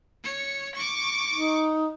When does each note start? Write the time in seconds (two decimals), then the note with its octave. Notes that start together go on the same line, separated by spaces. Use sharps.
0.24 C#5 C#7
0.75 C#6 D6
1.33 D#4